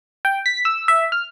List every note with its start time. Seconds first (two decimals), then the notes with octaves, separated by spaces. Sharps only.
0.25 G5
0.46 B6
0.65 E6
0.88 E5
1.12 F6